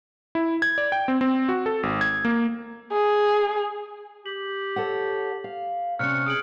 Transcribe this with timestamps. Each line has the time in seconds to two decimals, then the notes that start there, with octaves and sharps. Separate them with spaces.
0.35 E4
0.62 G#6
0.78 D5
0.92 G5
1.08 C4
1.21 C4
1.49 F#4
1.66 A4
1.83 G#1
2.01 G#6
2.25 A#3
2.92 G#4
4.26 G4 F#7
4.76 A4 C#5 F#5
5.44 F5
5.99 C3 C#4 C5 D5 C#6 F6 F#6 C#7
6.26 G#4 D#6 D7 F#7